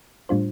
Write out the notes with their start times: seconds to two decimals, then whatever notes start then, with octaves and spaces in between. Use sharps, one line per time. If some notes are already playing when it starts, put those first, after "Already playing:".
0.29 A2 G3 D4 F4 C5